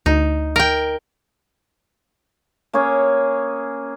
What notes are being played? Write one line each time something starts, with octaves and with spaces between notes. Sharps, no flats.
D2 D#4
A#4 G5
A#3 C#4 G#4 C#5